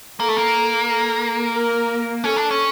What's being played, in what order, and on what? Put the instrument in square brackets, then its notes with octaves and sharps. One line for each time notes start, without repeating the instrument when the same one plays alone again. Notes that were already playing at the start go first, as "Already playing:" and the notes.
[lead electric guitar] A#3 [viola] A4
[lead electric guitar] A3
A#3
[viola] A4
A#4
[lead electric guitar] C#4 [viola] A4
[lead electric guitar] D4
C#4